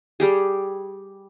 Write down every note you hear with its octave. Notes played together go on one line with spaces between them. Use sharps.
G3 G4 G#4